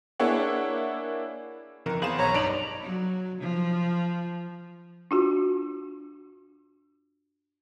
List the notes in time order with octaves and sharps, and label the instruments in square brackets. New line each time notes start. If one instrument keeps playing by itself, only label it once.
[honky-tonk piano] A#3 D4 E4 G#4 C#5 F#5
[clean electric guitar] F2 D#3 E3 [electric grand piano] A#4
[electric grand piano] E2 F5 E7 [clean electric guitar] G#4 C5 B5
[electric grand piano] B1 [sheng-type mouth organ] C#5 A#5
[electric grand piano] G2 D5 D7 [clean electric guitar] D4 A#5 B5 [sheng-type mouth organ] D#4
[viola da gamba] F#3
F3
[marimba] D4 F4 F#4